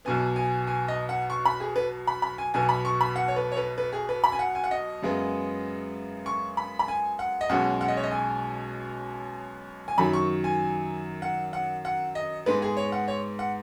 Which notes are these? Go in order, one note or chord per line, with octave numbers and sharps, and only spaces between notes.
B1 B2 B3 G#5
G#5
G#5
D#5
F#5
C#6
B5
G#4
B4
B5
B5
G#5
B1 B2 B3 G#5
B5
C#6
B5
F#5
C#5
B4
C#5
B4
B4
G#4
B4
B5
G#5
F#5
G#5
F#5
D#5
F#2 C#3 G#3 B3
C#6
B5
B5
G#5
F#5
D#5
B1 B2 G#3 C#4 F#5
F#5
D#5
C#5
D#5
G#5
G#5
F#2 D#3 F#3 B5
C#6
G#5
F#5
F#5
F#5
D#5
G#2 G#3 B3 B4
G#4
C#5
F#5
C#5
F#5